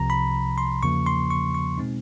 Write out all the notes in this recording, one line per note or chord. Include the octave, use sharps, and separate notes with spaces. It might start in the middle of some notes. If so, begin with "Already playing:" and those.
Already playing: C2 C3 F3 A#5
B5
C6
E2 C#3 F3 A#3 C#6
C6
C#6
C#6
B2 G#3 C4 D#4